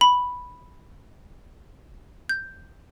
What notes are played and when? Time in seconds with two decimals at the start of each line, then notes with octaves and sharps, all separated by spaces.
0.01 B5
2.29 G6